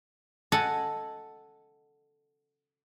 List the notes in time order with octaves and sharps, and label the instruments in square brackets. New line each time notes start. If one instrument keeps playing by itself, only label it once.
[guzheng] A4 D#5 F#5 G#5